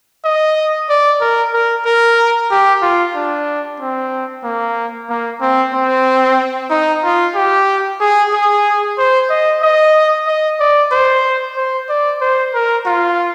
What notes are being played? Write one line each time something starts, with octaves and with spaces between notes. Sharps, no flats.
D#5
D5
A#4
A#4
A#4
G4
F4
D4
C4
A#3
A#3
C4
C4
D#4
F4
G4
G#4
G#4
C5
D#5
D#5
D#5
D5
C5
C5
D5
C5
A#4
F4